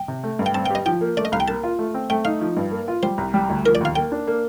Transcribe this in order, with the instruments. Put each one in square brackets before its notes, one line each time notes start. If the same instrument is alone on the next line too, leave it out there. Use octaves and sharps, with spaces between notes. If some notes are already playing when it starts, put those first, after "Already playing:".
Already playing: [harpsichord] G5
[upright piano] C3
A3
G2
[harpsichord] G5
[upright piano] C4 [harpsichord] A5
[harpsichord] G5
[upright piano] G4 [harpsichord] D#5
[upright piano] F3 [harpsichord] G5
[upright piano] A#3
[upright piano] A3 [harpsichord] D5
[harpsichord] D#5
[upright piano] C2 [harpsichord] F5
[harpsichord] G5
[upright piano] A#3 [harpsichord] A5
[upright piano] F4
A3
C4
[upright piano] A3 [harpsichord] G5
[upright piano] D#4 [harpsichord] F5
[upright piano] F3
G2
A#3
F4
[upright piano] G3 [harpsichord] C5
[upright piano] C2
G3
D2
[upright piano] F3 [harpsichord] A#4
[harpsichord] D5
[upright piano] D#2 [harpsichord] F5
[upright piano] A#3 [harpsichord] G5
[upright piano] D4
A#3